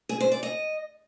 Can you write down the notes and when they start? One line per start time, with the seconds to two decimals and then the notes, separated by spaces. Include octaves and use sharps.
0.09 G#4
0.20 C5
0.32 D5
0.43 D#5